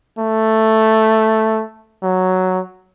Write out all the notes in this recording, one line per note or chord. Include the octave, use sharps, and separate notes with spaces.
A3
F#3